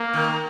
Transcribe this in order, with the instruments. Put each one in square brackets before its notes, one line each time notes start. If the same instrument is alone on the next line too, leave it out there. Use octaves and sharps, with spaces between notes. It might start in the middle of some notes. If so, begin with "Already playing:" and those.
Already playing: [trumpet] A#3
[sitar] D#3